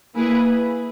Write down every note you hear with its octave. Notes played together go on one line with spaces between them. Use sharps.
A#3 E4 G#4 B4